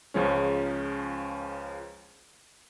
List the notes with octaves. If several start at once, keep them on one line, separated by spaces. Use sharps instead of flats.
C#2 F3 G#3 C#4